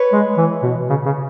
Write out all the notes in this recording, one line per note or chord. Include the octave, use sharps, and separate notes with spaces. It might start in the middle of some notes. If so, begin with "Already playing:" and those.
Already playing: B4 C#5
G#3
E3
B2
C#3
C#3